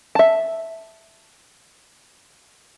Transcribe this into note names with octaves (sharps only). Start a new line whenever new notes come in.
E5 A5